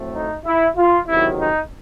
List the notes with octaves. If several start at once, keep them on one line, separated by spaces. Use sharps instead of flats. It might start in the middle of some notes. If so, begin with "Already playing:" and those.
Already playing: A2 F#3 A3 C4
D#4
E4
F4
C#2 C3 D#3 F#3 E4
D#4